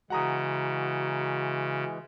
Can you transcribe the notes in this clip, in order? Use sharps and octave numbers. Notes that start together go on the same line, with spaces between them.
C#3 E3 G#3 F#4 F#5 A#5 D#6